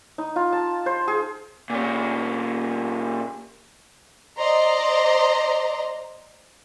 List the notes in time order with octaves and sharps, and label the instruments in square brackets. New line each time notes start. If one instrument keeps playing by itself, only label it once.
[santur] D#4
F4
A5
C5
G#4
[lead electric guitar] A#2 C#4
[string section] C5 D5 D#5 A#5 C6